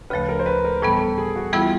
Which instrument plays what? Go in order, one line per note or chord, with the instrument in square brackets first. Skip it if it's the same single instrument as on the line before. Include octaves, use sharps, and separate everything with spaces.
[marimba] D2 C#3 F3 A3 [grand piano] B4
[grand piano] A#4
C5
B4
A#4
[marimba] A2 E3 G3 B3 [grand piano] A4
[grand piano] G#4
F#4
[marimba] E3 G3 B3 E4 G#4 [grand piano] F4